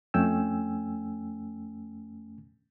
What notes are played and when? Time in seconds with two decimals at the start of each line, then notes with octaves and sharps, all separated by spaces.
0.14 F2 A3 C#4 G5 G#5 E6